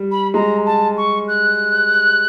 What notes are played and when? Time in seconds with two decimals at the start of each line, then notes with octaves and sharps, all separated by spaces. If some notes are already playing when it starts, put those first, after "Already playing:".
Already playing: G3
0.11 B5
0.34 G#3 A#5
0.66 A5
0.97 C#6
1.28 F#6